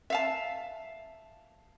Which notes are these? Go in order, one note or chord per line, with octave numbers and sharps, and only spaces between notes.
E5 F5 A5